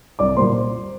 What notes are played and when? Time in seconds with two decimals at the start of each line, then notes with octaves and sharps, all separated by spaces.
0.19 C2 D5 D6
0.37 A#2 G3 A#3 C5 C6